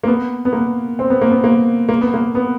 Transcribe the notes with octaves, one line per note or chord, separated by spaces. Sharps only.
A#3
B3
B3
A#3
C4
B3
A#3
B3
A#3
A#3
B3
A#3
B3